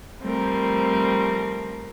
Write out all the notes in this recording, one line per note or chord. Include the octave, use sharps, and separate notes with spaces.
F3 G3 A3 C4 A#4